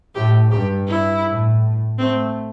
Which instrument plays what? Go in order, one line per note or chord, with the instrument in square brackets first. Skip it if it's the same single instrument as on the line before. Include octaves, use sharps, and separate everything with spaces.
[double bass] A2 [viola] G4
[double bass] G2 [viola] G4
[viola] E4
[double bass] A2
[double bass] A3 [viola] C4